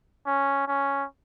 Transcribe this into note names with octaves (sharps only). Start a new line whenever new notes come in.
C#4
C#4